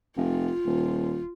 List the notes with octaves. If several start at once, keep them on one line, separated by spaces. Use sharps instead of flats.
F1 F4
D#1